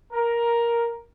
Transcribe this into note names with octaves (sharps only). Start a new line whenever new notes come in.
A#4